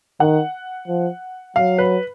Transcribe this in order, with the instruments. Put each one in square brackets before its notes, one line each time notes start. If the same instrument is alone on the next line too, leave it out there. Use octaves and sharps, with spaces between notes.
[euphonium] D#3 [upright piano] F#5
[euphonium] F3
[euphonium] F#3 [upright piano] F5
[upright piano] B4